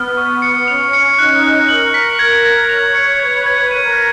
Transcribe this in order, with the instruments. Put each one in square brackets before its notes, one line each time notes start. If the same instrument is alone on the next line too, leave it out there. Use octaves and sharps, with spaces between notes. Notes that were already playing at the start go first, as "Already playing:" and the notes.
Already playing: [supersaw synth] B3 [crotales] F6
[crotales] C#6
C#7
[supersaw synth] C#4 [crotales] F7
[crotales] C#7
[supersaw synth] D#4 [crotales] F#6
[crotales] F#6
[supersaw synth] A#4 [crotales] F#7
[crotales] B6
G#6
G#6
[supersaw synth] C#5 [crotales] F7
[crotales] C#7
[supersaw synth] B4 [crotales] G#6
[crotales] G#6
[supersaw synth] A#4 [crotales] D#7
[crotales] B6